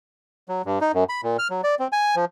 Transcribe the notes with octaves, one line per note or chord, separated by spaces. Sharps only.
F#3
G2
D#4
F#2
B5
A#2
F6
F#3
D5
C4
G#5
F3